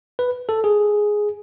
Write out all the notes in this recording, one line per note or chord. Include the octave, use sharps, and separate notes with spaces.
B4
A4
G#4